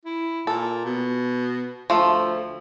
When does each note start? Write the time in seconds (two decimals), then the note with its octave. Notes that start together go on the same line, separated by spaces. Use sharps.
0.05 E4
0.47 A#2 A4
0.85 B2
1.90 D2 F3 A3